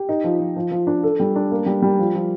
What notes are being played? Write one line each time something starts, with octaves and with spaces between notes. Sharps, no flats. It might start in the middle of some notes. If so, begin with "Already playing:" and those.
Already playing: G4
D#4
F3
F3
F3
F3
D4
A4
G3
D4
A#3
G3
G3
F3
F3